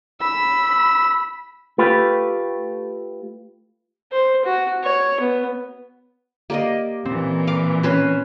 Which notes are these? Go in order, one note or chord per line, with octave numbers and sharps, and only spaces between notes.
B5 E6
A3 F4 G4 B4
C5
F#4
C#5
B3
A#3 G4 D5 D#5
A#2 E3 C4
F5 D6
C#4 B4 C5